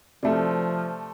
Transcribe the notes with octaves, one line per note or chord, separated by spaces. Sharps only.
C3 F3 A3 D5 E5